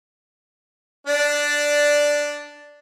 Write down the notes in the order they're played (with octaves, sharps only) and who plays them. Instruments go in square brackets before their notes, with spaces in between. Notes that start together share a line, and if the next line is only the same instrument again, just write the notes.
[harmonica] D4 D5